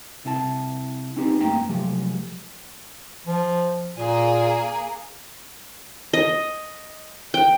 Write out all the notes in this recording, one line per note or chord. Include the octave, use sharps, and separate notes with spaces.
C2 C3 E4 A4 A5
C4 C#4 D#4 G4 A4 B4
G2 A3 A#3 G5 A#5
C3 F3 F#3 G#3 A3 G4
F3
A#2 A#3 G#4
D#5
G5